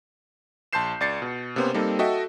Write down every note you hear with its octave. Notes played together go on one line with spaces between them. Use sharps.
A#1 A5 C6 G6 C7 E7
C#2 D5 A6 C7 C#7
B2
C3 A#3 B3 C#4 C5
G3 A#3 C4 D#4 A4
F#4 A4 D#5 E5 G5